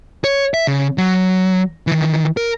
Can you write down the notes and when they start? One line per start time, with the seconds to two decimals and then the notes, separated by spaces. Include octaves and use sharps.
0.24 C#5
0.54 E5
0.67 C#3
0.98 F#3
1.87 D#3 E3
2.37 A#4